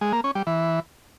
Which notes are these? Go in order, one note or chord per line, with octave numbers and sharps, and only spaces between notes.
G#3
A#3
C#4
G3
E3